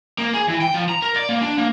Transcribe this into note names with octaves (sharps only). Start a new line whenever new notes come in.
A#3
G#4
E3
G5
F3
A#5
A#4
D5
A#3
D4
A#3